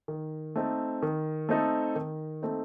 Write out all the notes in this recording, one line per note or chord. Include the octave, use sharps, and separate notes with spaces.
D#3
A3 C4 D#4 A4
D#3
A3 C4 D#4 A4
D#3
A3 C4 D#4 A4